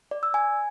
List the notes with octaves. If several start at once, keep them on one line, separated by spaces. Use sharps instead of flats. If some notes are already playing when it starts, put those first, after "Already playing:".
D5
E6
G#5